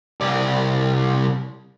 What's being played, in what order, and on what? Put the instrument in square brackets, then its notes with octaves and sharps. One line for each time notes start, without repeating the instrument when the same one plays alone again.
[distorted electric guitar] C2 D5